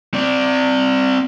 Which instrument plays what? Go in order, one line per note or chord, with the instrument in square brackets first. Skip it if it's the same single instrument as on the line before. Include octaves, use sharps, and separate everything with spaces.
[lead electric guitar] C4 D5